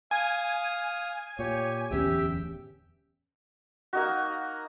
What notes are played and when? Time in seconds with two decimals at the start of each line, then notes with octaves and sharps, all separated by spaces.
0.11 F5 G#5 D#6
1.39 A#2 G4 C#5
1.91 D1 E2 C#4 G4 E5 G5
3.93 A#3 D#4 F#4